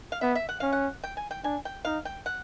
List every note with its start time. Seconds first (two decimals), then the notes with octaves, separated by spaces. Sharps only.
0.12 F5
0.21 B3 E5
0.35 E5
0.49 F#5
0.60 C#4 F5
0.73 F#5
1.04 G5
1.17 G#5
1.31 G5
1.44 D4 G#5
1.65 G5
1.85 D#4 F5
2.05 G5
2.26 F#5